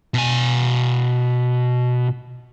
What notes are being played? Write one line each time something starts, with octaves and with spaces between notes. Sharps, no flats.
B2 G#5